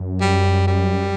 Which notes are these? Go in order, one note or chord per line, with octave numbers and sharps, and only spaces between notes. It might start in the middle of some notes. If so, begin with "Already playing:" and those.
Already playing: F#2
G3
G3